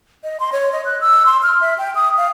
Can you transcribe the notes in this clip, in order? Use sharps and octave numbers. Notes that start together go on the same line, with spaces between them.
D#5
C6
C#5
D#5
F#6
E6
C6
F6
E5
G5
D#6
F5